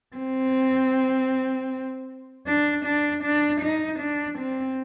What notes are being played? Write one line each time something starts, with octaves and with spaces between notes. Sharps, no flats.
C4
D4
D4
D4
D#4
D4
C4